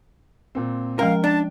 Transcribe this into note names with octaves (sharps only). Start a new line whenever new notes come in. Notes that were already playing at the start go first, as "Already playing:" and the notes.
A#2 C4
F3 G#3 C#4 A#4 F5 G5
D4 A5 A6